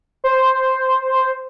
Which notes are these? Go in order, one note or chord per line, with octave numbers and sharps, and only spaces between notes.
C5